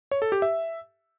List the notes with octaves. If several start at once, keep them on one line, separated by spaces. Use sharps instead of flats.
C#5
A4
G4
E5